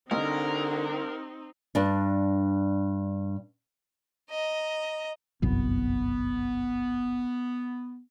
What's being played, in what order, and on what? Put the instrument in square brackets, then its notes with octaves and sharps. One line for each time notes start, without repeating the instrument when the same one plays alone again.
[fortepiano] C2 D#5 [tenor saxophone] D3 [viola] C4 D#4 [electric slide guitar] A#4
[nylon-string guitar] G2 D4
[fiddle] D#5 A#5
[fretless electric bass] G1 C2 F#2 [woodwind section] B3